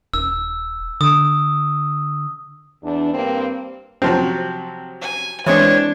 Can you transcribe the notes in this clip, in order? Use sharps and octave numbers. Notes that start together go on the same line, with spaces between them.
D#1 E6
D3 D#6
E2 D4
G2 A#3 C4
C3 F3 F#3 C4
G#5
E3 G#3 C4 D4 C#5